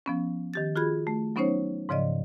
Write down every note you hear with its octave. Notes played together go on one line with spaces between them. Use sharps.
F3 B3 C#4
D#3 G4 A6
F4 F#4 G#4 B5 G#6
A3
F#3 B3 C#4 D#4 C5 C#5
G#2 C#3 F3 D5 D#5